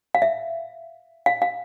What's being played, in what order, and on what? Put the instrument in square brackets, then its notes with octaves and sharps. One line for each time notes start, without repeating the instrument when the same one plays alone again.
[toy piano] F5
E5
F5
F5